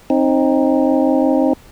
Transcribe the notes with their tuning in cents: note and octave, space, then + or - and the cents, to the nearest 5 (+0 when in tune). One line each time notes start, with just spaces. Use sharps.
C4 +25 D#4 +0